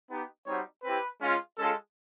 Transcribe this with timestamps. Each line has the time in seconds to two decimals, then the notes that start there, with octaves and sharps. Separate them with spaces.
0.08 B3 D#4 G4
0.46 G3 C4 D#4 F#4 C#5
0.83 C4 E4 G4 B4
1.21 G#3 C#4 F4
1.58 G#3 C#4 F4 A4